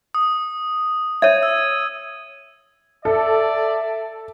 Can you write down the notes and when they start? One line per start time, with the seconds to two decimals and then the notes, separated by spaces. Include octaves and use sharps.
0.14 D#6
1.22 C#5 E5 G#6 D#7
1.43 E6
3.05 A4 D5 E5